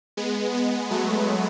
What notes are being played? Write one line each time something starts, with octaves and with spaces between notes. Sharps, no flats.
G#3 B3
G#3 B3
F#3 A3